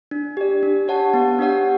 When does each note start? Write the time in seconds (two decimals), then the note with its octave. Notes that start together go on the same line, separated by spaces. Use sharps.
0.11 D4
0.37 G4 D5
0.63 D4
0.88 G4 C#5 F#5 A5
1.14 B3
1.39 D4 G4 C#5 F#5